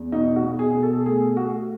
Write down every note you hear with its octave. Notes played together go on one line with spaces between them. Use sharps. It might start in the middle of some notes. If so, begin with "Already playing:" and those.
Already playing: E2
B2 D#4
F#4
B2
G#4
B2
A4
A3 G#4
A3 F#4